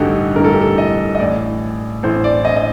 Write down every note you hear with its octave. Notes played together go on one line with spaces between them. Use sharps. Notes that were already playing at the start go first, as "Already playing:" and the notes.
Already playing: A1 G2 D3 D#4 F#4 G4 A4
A1 G2 D3 A#4
A4
G4
A4
D#5
D#5
A1 A2 D5
A1 A2 C5
D5
D#5
D#5